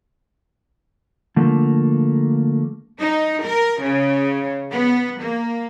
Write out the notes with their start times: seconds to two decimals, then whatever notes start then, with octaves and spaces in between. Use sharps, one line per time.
1.36 D3 F3 A3 A#3
2.99 D#4
3.44 A#4
3.82 C#3
4.72 B3
5.21 A#3